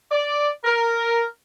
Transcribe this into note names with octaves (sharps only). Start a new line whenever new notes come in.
D5
A#4